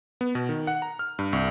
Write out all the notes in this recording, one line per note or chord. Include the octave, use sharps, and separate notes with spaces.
B3
B2
D#3
F#5
A#5
F6
G2
C2